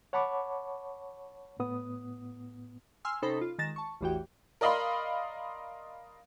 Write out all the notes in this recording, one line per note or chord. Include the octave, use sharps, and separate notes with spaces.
C#5 F#5 A5 B5 C#6 D6
A2 B3 D#6
G#5 C6 E6 F6
C3 C#4 D#4 A4 C5 B5
F4
D#3 G#3 A6 A#6 E7
A5 C#6
A1 E2 E3 F#4 G4 G5
A#4 D5 D#5 F5 B5 C6